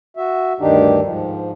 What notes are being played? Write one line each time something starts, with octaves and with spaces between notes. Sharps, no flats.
F#4 E5
D2 G2 D#3 D4 D#4 G4
G#2 F3